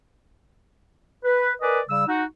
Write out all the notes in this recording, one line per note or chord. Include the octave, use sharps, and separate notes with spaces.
B4
A#4 B4 D5 D#5 G#5
C#3 G3 E6
D#4 F#4